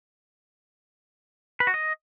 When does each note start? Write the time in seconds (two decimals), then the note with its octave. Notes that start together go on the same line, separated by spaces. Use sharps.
1.60 B4
1.67 F#4
1.74 D#5